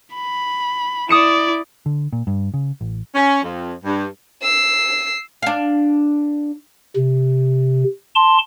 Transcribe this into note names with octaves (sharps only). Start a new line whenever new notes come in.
B5
E4 D5 D#6 C#7 E7
D3
A#2
G2
C#3
A1
C#4
F2
G2
E6 C7
D4 F5
C3
A5 C6